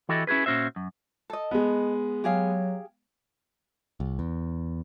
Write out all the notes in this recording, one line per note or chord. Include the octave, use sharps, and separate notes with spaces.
E3 E4 F#4 G4 A4 D#5
C#4 E4 F#4 G#4 B4
A#2 C#4 F#4 C5 E5
F#2
A4 D#5
G#3 B3
F#3 G4 G#4 F5
C2
E2